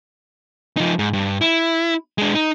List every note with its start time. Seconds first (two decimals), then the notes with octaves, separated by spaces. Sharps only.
0.77 F3 D#4
0.99 G#2
1.13 G2
1.41 E4
2.18 G#3 D4
2.34 D#4